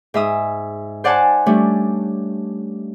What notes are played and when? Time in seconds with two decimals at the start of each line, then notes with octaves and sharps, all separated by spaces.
0.14 G#2 E5 D#6
1.04 C5 D5 F#5 G#5 A5
1.46 G3 A3 C#4 D4